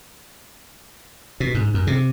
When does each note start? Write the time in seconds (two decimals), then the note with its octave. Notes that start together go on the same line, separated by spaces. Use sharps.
1.40 B2
1.55 G#2
1.74 F#2
1.87 C3